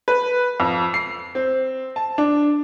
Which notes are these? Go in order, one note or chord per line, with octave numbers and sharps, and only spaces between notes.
B4
F2
C7
C4
A5
D4